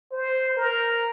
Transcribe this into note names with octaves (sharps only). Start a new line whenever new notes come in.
C5
A#4